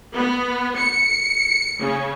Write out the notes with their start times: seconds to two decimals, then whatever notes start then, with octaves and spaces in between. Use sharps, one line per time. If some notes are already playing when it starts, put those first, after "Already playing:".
0.14 B3
0.78 C#7
1.81 C#3